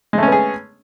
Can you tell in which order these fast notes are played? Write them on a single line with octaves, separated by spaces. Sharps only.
G#3 A3 C#4 B3 G#4